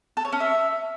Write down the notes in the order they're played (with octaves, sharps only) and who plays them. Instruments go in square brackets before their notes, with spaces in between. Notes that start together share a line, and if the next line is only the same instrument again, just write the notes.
[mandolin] A4
C#5
C#4
E5